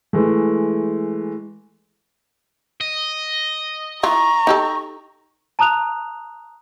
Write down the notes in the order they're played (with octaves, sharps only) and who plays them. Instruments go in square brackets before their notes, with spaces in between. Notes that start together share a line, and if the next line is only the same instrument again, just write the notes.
[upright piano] E3 G#3 A3
[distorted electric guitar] D#5
[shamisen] E3 F4 [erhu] A#5 [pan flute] C#6
[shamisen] D#4 G4 A4
[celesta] A5 A#5 D#6 F#6 F7